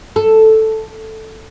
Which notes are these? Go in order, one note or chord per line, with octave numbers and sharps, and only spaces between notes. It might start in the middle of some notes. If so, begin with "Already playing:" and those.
A4